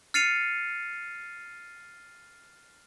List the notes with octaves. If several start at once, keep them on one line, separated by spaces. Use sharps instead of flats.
F6 A6 C7 C#7 D#7 F7